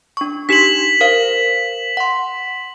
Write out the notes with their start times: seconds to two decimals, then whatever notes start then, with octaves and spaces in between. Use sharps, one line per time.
0.17 D4 C#6
0.49 D4 D#4 G4 B6 E7 F#7
1.01 A#4 C5 F5
1.97 F#5 C6